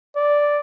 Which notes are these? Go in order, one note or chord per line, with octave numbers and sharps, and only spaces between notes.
D5